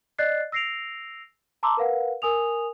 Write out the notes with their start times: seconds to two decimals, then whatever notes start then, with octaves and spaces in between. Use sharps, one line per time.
0.18 D5 D#5 F#6 A6 C7
0.52 E6 A#6 C7 D7 F7
1.63 A5 A#5 C6 D6 E6
1.77 A#4 B4 F5 F#5
2.22 A#4 G#5 D#6 F7